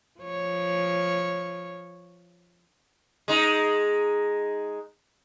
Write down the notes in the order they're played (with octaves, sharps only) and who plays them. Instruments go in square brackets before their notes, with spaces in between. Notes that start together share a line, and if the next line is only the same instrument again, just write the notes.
[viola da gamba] F3 C#5
[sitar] G#3 D#4